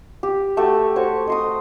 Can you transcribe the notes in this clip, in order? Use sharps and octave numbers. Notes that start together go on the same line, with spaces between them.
G4
A3 F#4 G4 A4
F#4 C5 C#5 C#6
D#5 C6 D#6